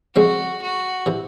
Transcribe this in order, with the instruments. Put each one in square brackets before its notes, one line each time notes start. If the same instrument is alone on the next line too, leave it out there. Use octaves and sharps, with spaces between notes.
[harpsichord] C#3 F3 G#3 C4 [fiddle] F#4
[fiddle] F#4
[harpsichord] C3 E3